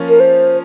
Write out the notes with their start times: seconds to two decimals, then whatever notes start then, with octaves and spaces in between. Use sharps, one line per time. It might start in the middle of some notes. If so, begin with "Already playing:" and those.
Already playing: F3 A#3 C#4 F4
0.09 A#4
0.20 C5